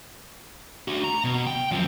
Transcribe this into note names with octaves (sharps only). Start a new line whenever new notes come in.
D4 F#4
A#5
B2
G5
F#2 F3